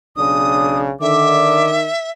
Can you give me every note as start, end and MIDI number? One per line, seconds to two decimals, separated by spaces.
0.17 0.92 35
0.17 0.92 49
0.17 0.92 62
0.17 0.79 87
1.01 1.71 50
1.01 1.88 51
1.01 2.11 76
1.01 1.71 86